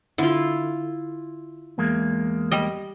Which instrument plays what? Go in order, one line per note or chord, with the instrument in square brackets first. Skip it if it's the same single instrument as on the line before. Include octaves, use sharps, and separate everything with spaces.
[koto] D3 [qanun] E4 F4
[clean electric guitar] E2 G#3 A#3
[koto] G3 D#5